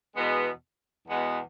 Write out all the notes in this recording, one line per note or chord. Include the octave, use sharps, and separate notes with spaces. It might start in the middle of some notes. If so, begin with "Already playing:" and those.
E2 B2 G#3 B3
E2 B2 G#3 B3